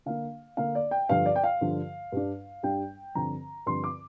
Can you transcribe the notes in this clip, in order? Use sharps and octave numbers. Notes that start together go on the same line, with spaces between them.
D3 A#3 D4 F5
D3 A#3 D4 F5
D5
G5
G2 D3 F3 F5
D5
G5
F5
G2 D3 F3
G2 G3 D4
G2 G3 D4 G5
G2 D3 F3 C4 A#5
G2 D3 F3 C4 C6
D6